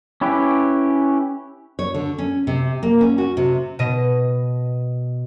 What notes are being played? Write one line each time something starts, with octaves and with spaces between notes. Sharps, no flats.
C#4 E4 G4 B4
C#5
D3
C#4
C3
A#3
C#4
F#4
C3
B2 D#5